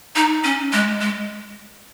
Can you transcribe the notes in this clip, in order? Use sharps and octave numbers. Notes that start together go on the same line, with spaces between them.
D#4
C#4
G#3
G#3